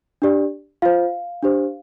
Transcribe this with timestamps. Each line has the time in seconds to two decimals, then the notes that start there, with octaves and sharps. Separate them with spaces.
0.22 D4 G4 D5
0.82 F4 C5 F5
1.43 D4 G4 C5